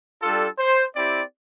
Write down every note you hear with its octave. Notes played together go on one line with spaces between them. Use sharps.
G3 D4 F4 A4
C5
C4 E4 G4 D5